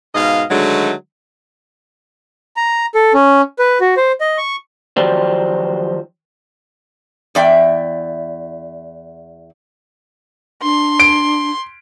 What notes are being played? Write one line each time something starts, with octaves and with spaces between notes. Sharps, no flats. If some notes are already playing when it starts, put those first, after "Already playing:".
G#2 B2 D#5 F5
D3 D#3 F#3 G#3 A3
A#5
A4
C#4
B4
F#4
C5
D#5
C#6
D#3 F3 F#3 G4 C5 D5
E2 D5 E5 G5
D4 C6
D7